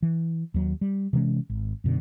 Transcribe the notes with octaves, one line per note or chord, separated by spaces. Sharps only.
E3
D#2 F#3
G3
C3 E3 G#3 C#4
G#1
F#2 B2 D3